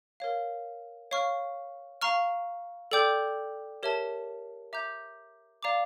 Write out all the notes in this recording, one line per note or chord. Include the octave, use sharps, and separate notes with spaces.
A#4 C#5 F5
C#5 F5 C#6 F6
F5 A#5 C#6 F6
A4 D5 G5 D6 G6
G4 A#4 C#5 E5 A5
E5 A#5 D6 G6
D5 F5 A#5 D6